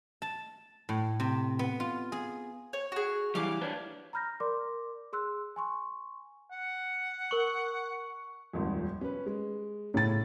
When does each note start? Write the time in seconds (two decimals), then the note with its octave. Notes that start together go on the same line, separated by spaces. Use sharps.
0.22 A5
0.89 A2
1.20 C3
1.59 B3
1.80 F4
2.12 G#4
2.73 C#5
2.92 F#4 G#4
3.35 E3 G3 F5 D6
3.61 D4 B4 C#5
4.13 A#5 B5 F6 G6 A#6
4.40 A#4 D5 C6 D6
5.13 G#4 C6 E6 F#6
5.56 G#5 C6 C#6
6.51 F#5
7.31 A#4 C#6 F#7
8.53 D#1 G#1 F2
9.01 C#4 B4
9.26 G#3
9.94 A2 C#3 A6